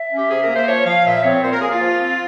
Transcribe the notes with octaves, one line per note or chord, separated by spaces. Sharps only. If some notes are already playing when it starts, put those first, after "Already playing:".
Already playing: E5
C#4
G4
C3 G#4
A#4
A#3
C5
F3 C#5
F3 F5
A#2 E5
C4 C#5
A#2 C5
A#4
A#3 G#4
F4
F3
C4